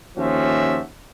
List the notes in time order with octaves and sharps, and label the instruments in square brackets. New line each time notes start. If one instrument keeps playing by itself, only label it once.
[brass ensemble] D#2 F3 C#4 F#4 E5